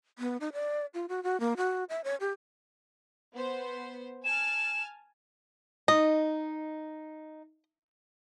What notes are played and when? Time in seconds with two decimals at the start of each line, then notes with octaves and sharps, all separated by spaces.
0.19 B3
0.40 D#4
0.53 D5
0.94 F4
1.09 F#4
1.23 F#4
1.40 A#3
1.57 F#4
1.89 E5
2.04 C#5
2.20 G4
3.33 B3 C5
4.24 G#5 A5 F6 E7
5.88 D#4 D#5